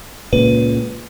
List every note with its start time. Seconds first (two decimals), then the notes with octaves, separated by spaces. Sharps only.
0.33 C#2 A#2 C#3 B4